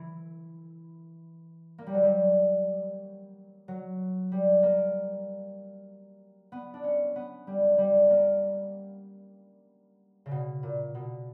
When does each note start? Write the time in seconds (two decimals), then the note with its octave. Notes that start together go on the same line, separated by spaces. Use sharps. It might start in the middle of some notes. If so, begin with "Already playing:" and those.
Already playing: E3
1.78 A#3
1.87 G3
1.94 F#3
2.03 G3
3.68 F#3
4.32 G3
4.63 A#3
6.52 B3
6.74 D4
6.84 C#4
7.16 B3
7.47 G3
7.78 G3
8.10 A#3
10.26 C#3
10.31 B2
10.63 A#2
10.95 B2